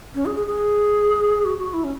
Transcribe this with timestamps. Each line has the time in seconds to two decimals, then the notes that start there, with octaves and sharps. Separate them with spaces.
0.15 C#4
0.26 G#4
0.36 G#4
0.47 G#4
1.45 F#4
1.58 F#4
1.74 E4
1.84 C#4